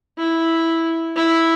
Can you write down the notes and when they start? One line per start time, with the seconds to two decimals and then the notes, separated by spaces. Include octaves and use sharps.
0.18 E4
1.16 E4